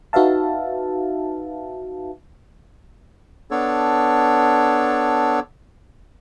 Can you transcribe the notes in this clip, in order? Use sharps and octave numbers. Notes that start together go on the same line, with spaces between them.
D#4 F#4 B4 E5 F5 A5
B3 D4 A4 C#5